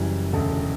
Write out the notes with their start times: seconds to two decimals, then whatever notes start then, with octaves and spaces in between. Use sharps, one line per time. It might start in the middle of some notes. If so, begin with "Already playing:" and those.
Already playing: F#1 F#2 E3 G3
0.33 E1 D2 C#3 A4